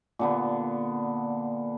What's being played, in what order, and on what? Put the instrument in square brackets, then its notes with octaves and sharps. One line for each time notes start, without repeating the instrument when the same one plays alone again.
[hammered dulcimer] A#2 D3 B3